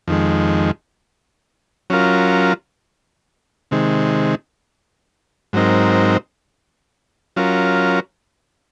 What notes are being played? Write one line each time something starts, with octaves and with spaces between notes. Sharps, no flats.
F2 D#3 G#3
F#3 C#4 F4 A#4
C3 D#3 G#3
G#2 F#3 C4 D#4 A#4
F#3 C#4 F4 A#4